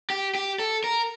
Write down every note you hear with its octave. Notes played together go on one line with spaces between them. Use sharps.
G4
G4
A4
A#4